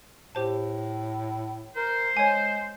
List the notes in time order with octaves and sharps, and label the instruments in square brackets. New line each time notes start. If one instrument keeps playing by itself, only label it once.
[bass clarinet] A2 [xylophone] G4 C5 A5
[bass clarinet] A#4 [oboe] C5
[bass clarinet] G#3 [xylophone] C#5 G#5